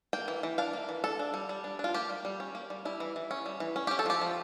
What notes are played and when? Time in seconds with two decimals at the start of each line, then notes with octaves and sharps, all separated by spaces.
0.13 A#3 G5
0.28 E3
0.43 E3
0.58 D4 F5
0.73 A#3
0.89 E3
1.04 D4 A4
1.19 D4
1.34 G3
1.49 G3
1.64 D4
1.79 D4
1.84 F4
1.94 A#3 G4
2.09 G3
2.25 G3
2.40 C#4
2.55 A#3
2.70 G3
2.85 G3 E4
3.00 E3
3.16 E3
3.31 C#4
3.46 G3
3.60 E3
3.76 C#4
3.87 G4
3.91 C#4
3.99 A4
4.06 F3 G4
4.21 F3